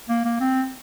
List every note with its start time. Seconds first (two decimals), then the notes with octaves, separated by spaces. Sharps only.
0.09 A#3
0.25 A#3
0.40 C4